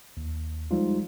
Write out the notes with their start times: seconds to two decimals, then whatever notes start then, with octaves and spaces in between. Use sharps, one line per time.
0.17 D#2
0.71 F3 G3 G#3 D#4 F4